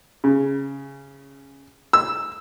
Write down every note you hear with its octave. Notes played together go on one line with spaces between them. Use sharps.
C#3
E6